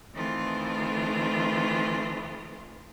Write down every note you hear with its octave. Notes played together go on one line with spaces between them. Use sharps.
D#3 E3 A3 C4 F4